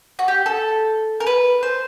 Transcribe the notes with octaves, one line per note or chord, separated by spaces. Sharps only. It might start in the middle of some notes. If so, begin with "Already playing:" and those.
F#4
G4
A4
A#4
B4
C5